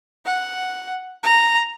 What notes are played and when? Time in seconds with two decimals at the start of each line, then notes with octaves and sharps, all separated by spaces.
0.26 F#5
1.23 A#5